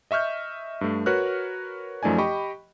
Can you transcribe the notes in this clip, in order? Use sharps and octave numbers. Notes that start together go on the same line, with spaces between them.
D#5 E5 C#6 F6 G6
G2 A3
F#4 A#4 B4 C#5 F6 F#6
F#2 F3 A3 D#4 D5 G#5
G4 D#5 G5 B5 C#6